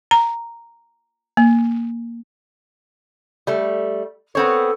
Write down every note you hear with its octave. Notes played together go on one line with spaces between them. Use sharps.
A#5
A#3
G3 A3
B3 C4 A4 C#5